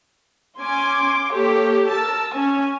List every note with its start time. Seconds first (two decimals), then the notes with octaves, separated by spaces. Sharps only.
0.60 C#4 G#5 C6 D6
1.32 A#3 G4 A4 C#5
1.90 A#4 A5 E6
2.34 C#4 G#5